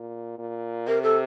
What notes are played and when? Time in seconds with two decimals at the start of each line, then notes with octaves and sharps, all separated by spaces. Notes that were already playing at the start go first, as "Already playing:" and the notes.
Already playing: A#2
0.39 A#2
0.87 C3 A#4
1.02 A4